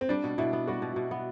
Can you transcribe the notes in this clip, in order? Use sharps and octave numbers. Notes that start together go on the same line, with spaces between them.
C4
G3 D4
B2
B2 E4
B3
G3 F#4
B2
B2
B3